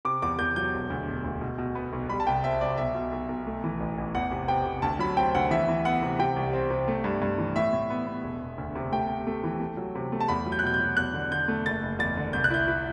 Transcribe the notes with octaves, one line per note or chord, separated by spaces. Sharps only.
C3 D6
E2 D6
E2 G6
F#3 G6
E1
D2
E1
D2
B2
B2
B3
B1
G3 B5
A5
C2 G5
C4 E5
C2 D5
B1 E5
B2
B1
B1
A3
E3
A1
A1
E2 F#5
C3
C3 G5
C3
D2 A5
F#3 B5
C4 G5
D2 F#5
E3 E5
E3
B3 F#5
C3
C3 G5
C2
C4
C3
A3
G2
G2
E3
A2 E5
A2
B3
B3
E1
E1
D2
C3
A3 G5
A3
A3
E3
A3
F#3
C3
A3
A5
E2 B5
F#3
G6
F#6
B2 G6
G6
F#3
E2 F#6
D3
D3 G6
A3
F#1 A6
F#1
E2 A6
D3
C2 G6
F#6
E4 G6
E4